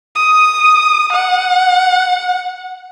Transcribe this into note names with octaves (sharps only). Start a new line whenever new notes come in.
D#6
F#5